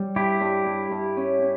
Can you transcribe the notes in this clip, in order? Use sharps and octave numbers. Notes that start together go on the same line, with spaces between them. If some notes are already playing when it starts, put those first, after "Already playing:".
Already playing: G3
G2 E4 G4
G2
G2
G2
C#4
C#4